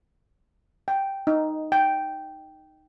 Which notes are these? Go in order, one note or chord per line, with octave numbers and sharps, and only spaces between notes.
G5
D#4
G5